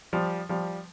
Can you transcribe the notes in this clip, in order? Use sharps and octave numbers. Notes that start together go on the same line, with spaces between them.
F3 G3
F3 G3